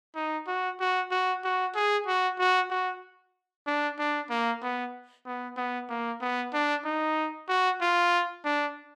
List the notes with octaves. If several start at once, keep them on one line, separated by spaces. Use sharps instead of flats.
D#4
F#4
F#4
F#4
F#4
G#4
F#4
F#4
F#4
D4
D4
A#3
B3
B3
B3
A#3
B3
D4
D#4
F#4
F4
D4